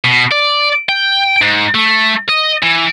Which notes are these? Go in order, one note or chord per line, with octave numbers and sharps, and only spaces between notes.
B2
D5
G5
G#2
A3
D#5
E3